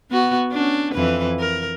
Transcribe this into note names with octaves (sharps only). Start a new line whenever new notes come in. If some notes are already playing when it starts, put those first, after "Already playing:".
B3 F#4
C#4 D4
F2 E3 B4
A#4